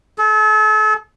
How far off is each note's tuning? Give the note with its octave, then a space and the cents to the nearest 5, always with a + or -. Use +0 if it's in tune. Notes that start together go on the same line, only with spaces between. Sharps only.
A4 -40